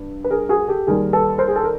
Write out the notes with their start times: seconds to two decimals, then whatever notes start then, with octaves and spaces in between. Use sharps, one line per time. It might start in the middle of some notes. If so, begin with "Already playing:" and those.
Already playing: G2
0.24 B4
0.31 G#4 A#4
0.49 F#4 G#4
0.68 G4 A4
0.87 D#2 D#3 G3 G#4 A#4
1.13 A4 B4
1.38 A#4 C5
1.48 G#4
1.56 A4
1.64 A#4